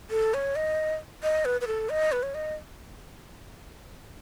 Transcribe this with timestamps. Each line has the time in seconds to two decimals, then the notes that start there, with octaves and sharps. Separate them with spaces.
0.11 A4
0.34 C#5
0.56 D#5
1.23 D#5
1.45 B4
1.61 B4
1.67 A4
1.90 D#5
2.12 B4
2.23 C#5
2.34 D#5